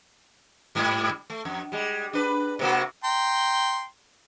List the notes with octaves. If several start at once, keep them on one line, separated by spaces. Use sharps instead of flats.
G#2 G3
A3
F2
G3 G#3
D4 B4
C3 A#3 F#4
G5 A#5 C6